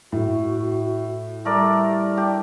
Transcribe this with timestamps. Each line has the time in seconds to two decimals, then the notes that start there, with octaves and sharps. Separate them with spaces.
0.12 A2 F#4
1.45 G3 A3 A#4 D5
2.17 D4 G4